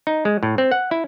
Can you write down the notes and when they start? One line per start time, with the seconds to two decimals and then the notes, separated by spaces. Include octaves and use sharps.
0.07 D#4
0.25 G#3
0.43 A2
0.58 C4
0.71 F#5
0.91 E4